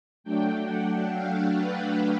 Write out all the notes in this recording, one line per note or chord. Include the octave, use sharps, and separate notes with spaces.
F#3 A3 D4 G5
F#5
F5
B4